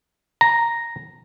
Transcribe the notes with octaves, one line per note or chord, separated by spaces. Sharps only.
A#5